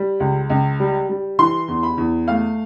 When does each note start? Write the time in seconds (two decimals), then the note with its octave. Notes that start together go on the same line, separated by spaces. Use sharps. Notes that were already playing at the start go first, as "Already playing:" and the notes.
Already playing: G3
0.20 C#2
0.50 C#2
0.80 G3
1.09 G3
1.39 E3 C6
1.68 E2
1.83 B5
1.97 E2
2.28 A3 F5